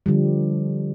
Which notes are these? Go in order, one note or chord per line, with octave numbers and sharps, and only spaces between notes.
D3 F3 G3